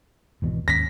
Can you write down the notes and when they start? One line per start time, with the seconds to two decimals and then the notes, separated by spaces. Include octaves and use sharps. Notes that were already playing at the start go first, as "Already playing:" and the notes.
0.42 G#1 E2 B2
0.68 D#2 G#2 C#4 A#6 B6